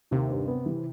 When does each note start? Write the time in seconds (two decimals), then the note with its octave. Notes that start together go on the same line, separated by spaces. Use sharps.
0.11 D#2 C3
0.30 G2
0.48 B3
0.66 E3